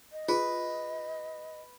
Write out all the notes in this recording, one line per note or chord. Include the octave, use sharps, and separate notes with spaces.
D#5
F4 G#4 B4